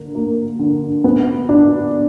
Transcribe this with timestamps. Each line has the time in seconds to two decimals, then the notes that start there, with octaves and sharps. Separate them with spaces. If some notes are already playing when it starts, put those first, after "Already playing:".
Already playing: D3 A#3
0.15 A#3
0.59 D3
1.04 B3
1.49 D4